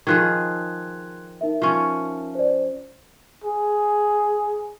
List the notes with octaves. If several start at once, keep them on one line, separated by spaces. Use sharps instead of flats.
D#3 F3 G#4 C6 F#6 G#6
D#4 A#4 E5
F3 C#4
C5 D5
G#4